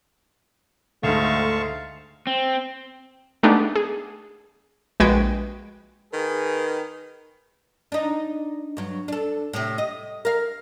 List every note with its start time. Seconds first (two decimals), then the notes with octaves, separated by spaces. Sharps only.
1.03 D2 G#2 A3 F5 A5 C#6
2.27 C4
3.43 G#3 A3 B3 D4 D#4 G4
3.76 G#4
5.00 A#1 G#3 F#4 B4 G5 G#6
6.13 D#3 G#4 B4
7.92 D4 D#4
8.77 G2 F#3
9.08 D4 A4
9.53 A2 C3
9.78 D#5
10.25 A#4 F5